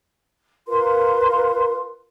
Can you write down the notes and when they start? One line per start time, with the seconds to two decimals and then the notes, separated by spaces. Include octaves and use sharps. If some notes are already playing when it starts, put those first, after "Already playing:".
0.67 F4 A#4 B4 C6